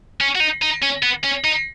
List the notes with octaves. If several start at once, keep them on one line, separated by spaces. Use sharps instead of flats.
C#4
F#4
D#4
D#4
C#4
B3
C#4
D#4